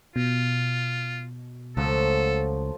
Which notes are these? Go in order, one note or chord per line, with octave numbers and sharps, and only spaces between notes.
B2 F4
C#2 F3 F#3 A3 A4